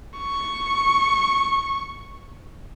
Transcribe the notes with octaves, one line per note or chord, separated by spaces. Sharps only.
C#6